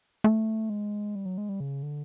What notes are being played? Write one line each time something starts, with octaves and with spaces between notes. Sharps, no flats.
A3
G#3
G3
F#3
G#3
G3
C#3
D3